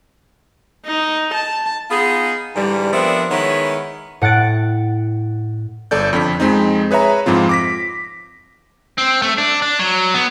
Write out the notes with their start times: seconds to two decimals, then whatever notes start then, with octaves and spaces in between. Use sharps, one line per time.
0.86 D#4
1.34 A5
1.91 B3 D#4 F4 G#4
2.56 G#2 D3 E3 G3
2.93 F3 B3 C4 D4 A#4 E5
3.30 D#3 G#3 B3 E4 C#5
4.21 A2 F#5 F#6 A6 D7
5.91 G1 A4 D5 G6
6.13 F2 D3 B6
6.40 F2 G#3 C4 D#4
6.91 G#4 B4 C#5 E5 A#5
7.26 F2 G#2 F3 C4 F4
7.49 D6 A#6 B6
8.98 C4
9.22 A3
9.38 D4
9.62 D4
9.79 F#3
10.14 B3